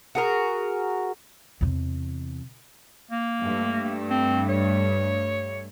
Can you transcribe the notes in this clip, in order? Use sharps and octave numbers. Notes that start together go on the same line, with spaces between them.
F#4 G#4 A#4
E2 C3
A#3
G2 A3
C4
C#5